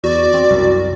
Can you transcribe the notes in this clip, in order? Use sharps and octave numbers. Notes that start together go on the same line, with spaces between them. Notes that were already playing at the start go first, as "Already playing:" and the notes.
E2 F#4 D5
C4
C2 F#2